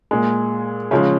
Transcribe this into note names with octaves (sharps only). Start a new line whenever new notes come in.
A#2 G#3
C#3 F3 G#3 C#4